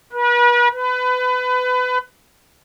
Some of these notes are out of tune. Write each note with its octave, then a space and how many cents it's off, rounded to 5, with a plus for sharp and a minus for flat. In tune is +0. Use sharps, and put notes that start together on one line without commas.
B4 -40
B4 +25